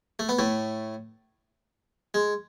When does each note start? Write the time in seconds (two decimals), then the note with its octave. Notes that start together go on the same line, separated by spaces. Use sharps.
0.19 A3
0.29 B3
0.39 A2 A3
2.14 G#3